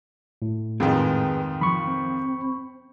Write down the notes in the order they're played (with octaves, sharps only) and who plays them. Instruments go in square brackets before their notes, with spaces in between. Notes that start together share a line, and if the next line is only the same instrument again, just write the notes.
[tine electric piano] A2
[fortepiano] F2 G#2 D#3 [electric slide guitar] G#4 B4 G5
[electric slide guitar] E3 F3 [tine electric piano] B5 C#6
[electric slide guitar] C4